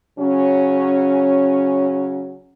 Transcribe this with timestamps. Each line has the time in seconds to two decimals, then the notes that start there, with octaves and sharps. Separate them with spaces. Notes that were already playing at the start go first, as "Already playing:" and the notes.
0.19 C#3 F#3 C#4